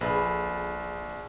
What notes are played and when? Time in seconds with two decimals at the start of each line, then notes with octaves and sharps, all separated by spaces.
0.01 A#1 G#4 A4 B4